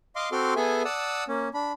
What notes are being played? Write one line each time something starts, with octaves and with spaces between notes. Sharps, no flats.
D#5 F5 C6 D6
C4 F#4 A4 C6 D6 F6
B3 G#4 A4 E5 G#5
D5 F#5 A5 D#6 E6
A#3 C#4
D4 B5